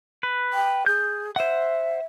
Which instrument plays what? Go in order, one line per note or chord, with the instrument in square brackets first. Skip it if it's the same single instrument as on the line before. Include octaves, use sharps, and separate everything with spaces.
[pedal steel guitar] B4
[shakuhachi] G5
[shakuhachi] G#4 [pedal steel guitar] G6
[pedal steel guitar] C5 F#5 [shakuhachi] E5